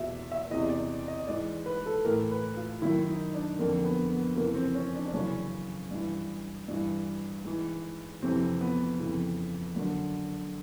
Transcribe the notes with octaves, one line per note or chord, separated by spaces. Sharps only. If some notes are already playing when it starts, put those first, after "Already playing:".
Already playing: E2 B2 E5
E5
E2 C3 E3 D#5
D5
D#5
G#2 E3 D5
B4
A4
A2 E3 A#4
B4
F4
F#2 D#3 E4
D#4
D4
F2 D3 A#3
B3
B3
F2 C#3 E3 A#3
C4
C#4
D4
D4
F#2 C#3 E3 C#4
G2 E3
G2 E3
G#2 E3
F2 C3 E3 C4
B3
F2 C#3 E3
F#2 D3